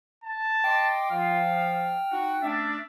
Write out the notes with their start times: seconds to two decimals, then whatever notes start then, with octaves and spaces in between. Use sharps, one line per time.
0.24 A5
0.64 D#5 G5 C6 D6
1.10 F3 F4 F5
1.54 F6
2.11 D#4 F#4 F#5
2.42 A3 C#4 D4 E5